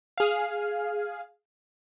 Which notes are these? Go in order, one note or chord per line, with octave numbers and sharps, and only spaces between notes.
G#4 F5